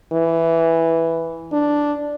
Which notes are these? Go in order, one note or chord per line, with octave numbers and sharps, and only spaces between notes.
E3
D4